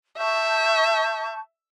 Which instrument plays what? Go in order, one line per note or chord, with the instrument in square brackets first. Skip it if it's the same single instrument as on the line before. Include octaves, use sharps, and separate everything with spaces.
[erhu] E5 [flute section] A5 C#6 G6